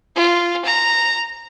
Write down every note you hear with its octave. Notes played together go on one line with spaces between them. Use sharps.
F4
A#5